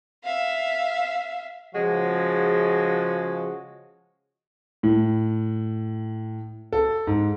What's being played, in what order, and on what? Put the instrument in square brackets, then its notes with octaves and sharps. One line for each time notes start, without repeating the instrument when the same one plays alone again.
[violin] E5 F5
[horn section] C#3 F3 G#3 F#4
[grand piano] A2
A4
G#2